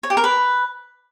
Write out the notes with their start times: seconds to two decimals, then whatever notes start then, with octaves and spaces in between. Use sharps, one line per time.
0.03 C#5
0.10 G4
0.17 A#4
0.24 B4